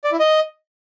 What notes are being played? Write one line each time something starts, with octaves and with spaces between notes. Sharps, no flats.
D5
E4
D#5